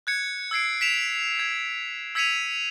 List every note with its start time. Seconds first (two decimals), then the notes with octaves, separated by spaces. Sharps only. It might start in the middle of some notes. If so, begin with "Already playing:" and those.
0.07 F#6 G#6 C#7
0.51 E6 G#6 C7 D7
0.81 B6 D7 E7 F7
1.39 G#6
2.15 E6 G#6 B6 C#7 D#7 F7